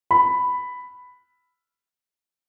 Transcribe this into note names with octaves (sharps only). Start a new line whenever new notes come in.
B5